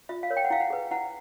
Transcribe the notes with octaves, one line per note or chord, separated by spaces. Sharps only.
F4 E5
F5
A#4 C#5
G5
F#5
E4 F5
F#5
G#4 B4
E4 F#5